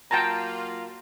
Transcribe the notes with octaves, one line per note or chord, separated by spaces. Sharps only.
F#3 A#3 F4 G5 A5 A#5